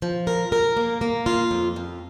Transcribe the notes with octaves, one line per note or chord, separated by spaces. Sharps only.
F3
A#4
A#4
A#3
A#3
F4
F2
F2